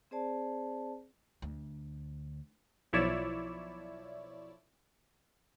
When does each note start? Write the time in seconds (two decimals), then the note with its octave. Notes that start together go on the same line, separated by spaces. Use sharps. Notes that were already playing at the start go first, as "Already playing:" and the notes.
0.11 C4 G#4 C5 D5 A5
1.42 D2
2.93 B1 F3 E4 C#5 D5 E7